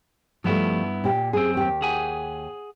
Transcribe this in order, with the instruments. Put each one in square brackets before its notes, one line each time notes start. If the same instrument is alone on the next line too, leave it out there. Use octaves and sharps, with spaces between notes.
[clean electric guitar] G2 B3 E4 [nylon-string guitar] F3 G3 A3
[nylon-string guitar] A#2 G4
[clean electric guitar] F#2 C4 [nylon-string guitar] G#4
[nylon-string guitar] D#2 G4
[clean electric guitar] G#4 F#5 G#5